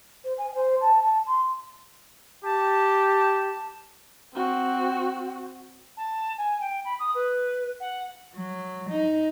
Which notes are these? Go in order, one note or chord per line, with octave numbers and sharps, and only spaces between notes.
C5
G#5
C5
A5
A5
C6
G4 A5
C4 F#4
A5
G#5
G5
B5
D#6
B4
F#5
F#3
D#4